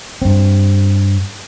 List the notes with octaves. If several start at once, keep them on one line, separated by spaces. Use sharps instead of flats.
G2 C4